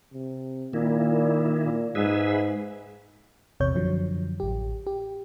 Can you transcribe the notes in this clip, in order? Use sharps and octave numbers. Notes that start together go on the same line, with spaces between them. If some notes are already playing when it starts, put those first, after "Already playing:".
C3
A#2 D#3 A#3 E4
A#2
G#2 G#4 B4 E5
A#1 E2 C3 C#5 G6
F#2 D3 F3 F#3
A1 G4
G4